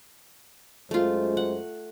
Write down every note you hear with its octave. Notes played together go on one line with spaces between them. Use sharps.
F#2 G#3 A3 F4 C5
F#5